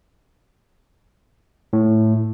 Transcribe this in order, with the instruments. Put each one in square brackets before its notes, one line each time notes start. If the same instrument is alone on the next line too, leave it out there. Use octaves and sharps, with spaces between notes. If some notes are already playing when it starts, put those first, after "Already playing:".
[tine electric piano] A2